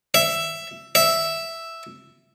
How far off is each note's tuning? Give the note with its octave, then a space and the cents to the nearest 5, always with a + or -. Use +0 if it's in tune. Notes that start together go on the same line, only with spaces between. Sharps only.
E5 +10
E5 +0